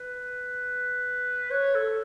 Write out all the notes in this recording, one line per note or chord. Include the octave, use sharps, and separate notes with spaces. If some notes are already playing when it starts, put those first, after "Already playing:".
Already playing: B4
C#5
A4